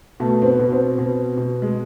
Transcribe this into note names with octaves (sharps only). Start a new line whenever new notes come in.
B2 A3
C4
B3
B2 B3
C4
B2
B2
G#3